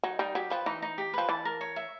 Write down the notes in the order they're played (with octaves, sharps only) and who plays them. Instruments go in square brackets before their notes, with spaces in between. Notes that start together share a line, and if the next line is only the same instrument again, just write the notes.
[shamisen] F#3 [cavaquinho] D#4
[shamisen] G3 [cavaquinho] D#4
[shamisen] F#3 [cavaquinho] G4
[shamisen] F3 [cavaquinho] B4
[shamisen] E3 [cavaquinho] D#4
[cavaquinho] D#4
G4
[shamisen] F3 [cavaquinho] B4
[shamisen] E3 [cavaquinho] A5
[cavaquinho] A#4
C#5
E5